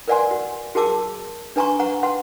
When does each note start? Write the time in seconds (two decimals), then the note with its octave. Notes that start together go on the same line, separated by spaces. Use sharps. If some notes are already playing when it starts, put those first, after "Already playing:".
0.08 A#4 B4 D5 F#5 G#5 C6
0.31 F#4
0.75 F#4 G#4 A#4 A5 D6 E6
1.56 D4 B4 G#5 A#5 C6 C#6
1.79 B4 F#5 A#5 C#6
2.03 B4 F#5 C6